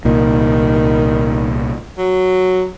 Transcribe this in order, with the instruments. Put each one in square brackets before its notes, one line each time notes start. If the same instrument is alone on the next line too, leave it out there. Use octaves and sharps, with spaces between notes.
[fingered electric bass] C2 A#2 [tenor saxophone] D#3
[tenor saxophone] F#3